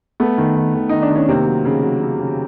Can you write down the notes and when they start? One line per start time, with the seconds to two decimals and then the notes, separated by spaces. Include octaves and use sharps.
0.20 A3 B3
0.38 D#3
0.56 D#3
0.74 D#3
0.89 D#3 D#4
1.02 D4
1.10 D#3
1.15 C#4
1.29 C3 A#3 C4
1.47 F#3
1.65 C#3
1.83 F#3
2.01 C#3
2.19 C#3